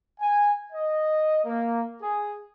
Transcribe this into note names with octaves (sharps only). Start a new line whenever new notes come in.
G#5
D#5
A#3
G#4